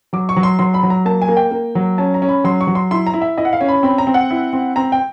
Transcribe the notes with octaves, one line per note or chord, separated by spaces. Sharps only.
F#3 D6
C#6
F#3
C6
F#3 C6
B5
F#3
A#5
A#3 A5
G#5
A#3
G5
A#3
F#3
C#4 A5
A#5
C#4
B5
F#3 C6
C#6
F#3
C6
E4 C6
A#5
E4
E5
E4 D#5
F#5
F5
C#4
B5
C4 B5
A#5
C4
F#5
E4
C4
C4 A#5
G5